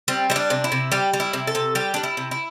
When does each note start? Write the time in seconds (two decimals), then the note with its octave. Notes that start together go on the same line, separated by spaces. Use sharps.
0.08 G3 C4
0.30 G3 E4
0.36 D4
0.50 C3
0.64 E4
0.72 C3
0.92 G3 G4
1.13 G3
1.20 E4
1.33 C3
1.47 A4
1.55 C3
1.75 G3 G4
1.94 G3 D4
2.03 E4
2.17 C3
2.31 E4